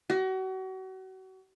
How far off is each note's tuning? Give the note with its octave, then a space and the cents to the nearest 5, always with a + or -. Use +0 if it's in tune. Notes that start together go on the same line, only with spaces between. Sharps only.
F#4 +35